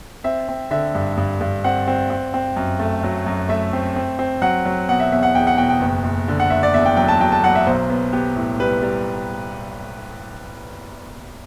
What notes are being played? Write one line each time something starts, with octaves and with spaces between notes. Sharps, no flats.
C4 E5
C4
D3 E5
G2
G2
G2
C4 F#5
C4
C4
C4
F#2
A3
F#3
F#2
A3 E5
C4
C4
C4
F#3 F#5
F#3
B2 F#5
E5
E2 E5
F#5
E2 G5
F#5
B2 G5
G5
F#1
F#1
D3
F#5
F#1 E5
D5
E2 E5
G5
F#3 G5
A5
F#3 G5
A5
F#3 F#5
E5
B1 C5
B3
B3 G4
A2
G3 B4
G3